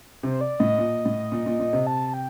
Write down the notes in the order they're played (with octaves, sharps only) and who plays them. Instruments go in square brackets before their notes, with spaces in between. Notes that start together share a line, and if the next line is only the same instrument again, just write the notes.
[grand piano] C3 [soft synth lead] C5
[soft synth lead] D5
[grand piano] A2 [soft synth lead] D#5
[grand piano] A#2
A2
A#2
A#2
A#2
C3
[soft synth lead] A5
G5